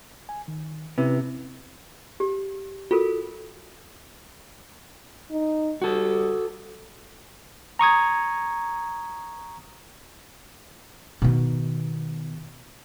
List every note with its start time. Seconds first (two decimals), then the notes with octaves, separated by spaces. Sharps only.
0.29 G#5
0.48 D#3
0.98 C3 C#4 E4 B4
2.20 G4
2.91 F4 F#4 A4 A#4
5.31 D#4
5.82 G3 F#4 A4
7.79 A#5 C#6 D#6 G#6
11.22 B2 D#3